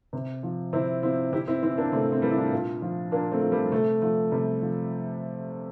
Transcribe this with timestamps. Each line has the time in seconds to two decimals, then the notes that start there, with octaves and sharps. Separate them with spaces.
0.13 C3
0.43 F3
0.73 C3 C4 E4
1.03 F3 C4 E4
1.32 C3 E4 G4
1.47 C4 E4
1.62 E3 C4 E4
1.78 A#3 D4
1.92 C3 A3 C4
2.12 C4
2.22 E3 G3 A#3
2.31 E4
2.38 D4 F4
2.52 A#2
2.82 F3
3.12 A#2 A#3 D4
3.32 A3 C4
3.42 F3
3.52 G3 A#3
3.72 C3 A3
4.02 F3 A3
4.32 C3 G3
4.62 F3